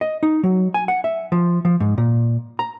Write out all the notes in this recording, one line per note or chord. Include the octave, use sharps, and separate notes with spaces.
D#5
D#4
F#3
G#5
F#5
E5
F3
F3
G#2
A#2
A#5